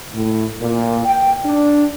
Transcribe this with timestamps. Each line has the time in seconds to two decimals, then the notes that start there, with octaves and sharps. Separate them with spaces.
0.14 A2
0.61 A#2
1.06 G5
1.45 D4